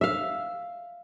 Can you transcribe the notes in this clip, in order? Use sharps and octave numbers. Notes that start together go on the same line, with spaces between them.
E5 F5